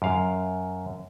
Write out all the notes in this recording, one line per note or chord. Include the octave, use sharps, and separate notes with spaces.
F#2 F5